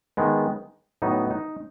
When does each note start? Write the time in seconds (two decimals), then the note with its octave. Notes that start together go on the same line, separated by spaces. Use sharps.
0.17 D#3 G#3 B3
1.02 A2 F#3 B3 D#4
1.30 D#4